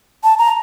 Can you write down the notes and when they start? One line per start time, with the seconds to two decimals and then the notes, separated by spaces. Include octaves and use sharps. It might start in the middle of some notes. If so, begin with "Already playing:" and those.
0.24 A5
0.39 A#5